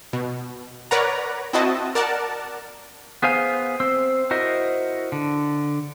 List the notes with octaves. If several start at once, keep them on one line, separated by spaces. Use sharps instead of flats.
B2
A#4 B4 C#5 D5 F#5 A#5
C4 E4 F#4 D#5 A5
A#4 D5 F#5 A5
B3 G#4 C5 F5 G#5
C4 C5 E6
E4 F#4 A#4 C5 D#5
D3